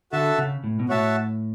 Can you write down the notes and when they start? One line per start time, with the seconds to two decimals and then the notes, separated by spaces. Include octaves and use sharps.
0.12 D3 F#4 A4 E5 A5
0.38 C#3
0.64 A2
0.79 B2
0.89 A2 F#4 C#5 E5 A5